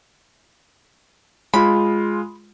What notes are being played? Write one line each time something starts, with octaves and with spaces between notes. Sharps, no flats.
G#3 F4 B5